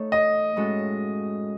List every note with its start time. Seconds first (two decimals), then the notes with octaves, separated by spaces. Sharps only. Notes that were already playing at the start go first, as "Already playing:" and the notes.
Already playing: A3 D#4 A4 C#5
0.12 D#5
0.56 A2 G#3 C#4 F#4 A4